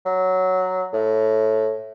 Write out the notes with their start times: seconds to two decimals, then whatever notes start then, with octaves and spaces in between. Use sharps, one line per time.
0.06 F#3
0.93 A2